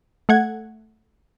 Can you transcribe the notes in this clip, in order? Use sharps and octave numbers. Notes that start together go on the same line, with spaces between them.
A3 F#5 G#6